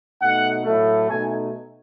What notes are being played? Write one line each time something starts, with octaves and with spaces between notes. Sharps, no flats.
B2 A3 D#4 F#5
A2 F#3 A3
B2 A3 D#4 G#5